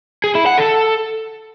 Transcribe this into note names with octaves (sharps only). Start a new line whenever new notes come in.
G#4
E4
F#5
A4